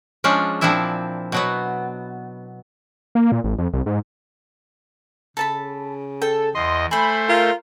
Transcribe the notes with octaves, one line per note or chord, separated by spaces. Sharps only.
F3 G#3 C#4 D4 F4
A#2 F3 C4 D4 E4 E5
B2 F#3 B3
A#3
A#2
A1
F2
C2
G#2
C#3 A4 A5 B5
A4 G5
E2 D#5 C6
A3 C5 G#5 B5 C6
F4 A#4